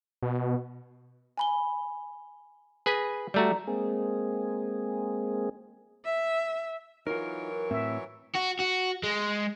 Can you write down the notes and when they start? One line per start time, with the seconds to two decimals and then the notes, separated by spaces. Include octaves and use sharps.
0.22 B2
1.38 G#5 B5 G7
2.86 G#4 B4 G#5 A#6 B6
3.34 G3 A3 F#4 D5 A#5
3.67 G#3 A#3 C4 G#4
6.05 E5
7.07 E3 F#3 D#4 F4 A#4 C#5
7.71 A2 C4 E5
8.35 F#4
8.59 F#4
9.04 G#3